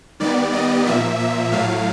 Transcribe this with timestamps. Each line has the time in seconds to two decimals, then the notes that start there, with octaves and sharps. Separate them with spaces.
0.20 D#3 G3 B3 D5
0.53 D#5
0.86 A#2 F3 A#3 E5
1.20 E5
1.52 A2 F#3 A3 F5